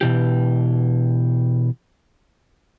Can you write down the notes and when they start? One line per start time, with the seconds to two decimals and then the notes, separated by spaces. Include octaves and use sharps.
0.01 B2 E3 G4